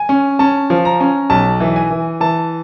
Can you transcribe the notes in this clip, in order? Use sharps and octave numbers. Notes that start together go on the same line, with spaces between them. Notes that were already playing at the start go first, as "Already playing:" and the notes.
Already playing: G#5
C#4
C#4 A5
F3
A#5
C#4
B1 A5
E3
G#5
E3
E3 A5